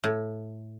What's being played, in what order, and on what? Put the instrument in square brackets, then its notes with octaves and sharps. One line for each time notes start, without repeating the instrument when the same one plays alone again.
[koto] A2